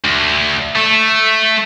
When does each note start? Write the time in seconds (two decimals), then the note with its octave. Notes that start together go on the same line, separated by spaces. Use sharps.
0.04 D2
0.76 A3